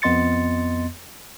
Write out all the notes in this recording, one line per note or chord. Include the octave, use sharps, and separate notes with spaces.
F2 B3 D#5 C6 A6 C#7